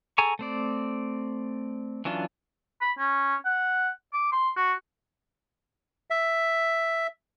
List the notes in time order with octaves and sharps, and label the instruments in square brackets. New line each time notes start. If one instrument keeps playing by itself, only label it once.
[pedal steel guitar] G#4 A4 G#5 A#5 C#6
A3 C4 D5
E3 F#3 C#4 D4 F4
[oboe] B5
C#4
F#5
D6
C6
F#4
[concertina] E5